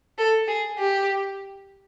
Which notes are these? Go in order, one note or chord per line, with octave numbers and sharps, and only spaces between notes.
A4
G#4
G4